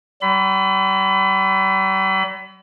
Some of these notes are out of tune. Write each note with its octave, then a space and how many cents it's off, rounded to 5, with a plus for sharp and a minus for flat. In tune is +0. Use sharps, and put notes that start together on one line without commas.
G3 -45 B5 +30